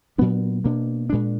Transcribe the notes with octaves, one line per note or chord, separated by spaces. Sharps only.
A#2 F#3 B3 D4
B2 A#3 D4
A#2 G#3 D4